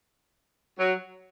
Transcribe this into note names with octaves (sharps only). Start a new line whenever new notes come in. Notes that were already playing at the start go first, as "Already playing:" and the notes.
F#3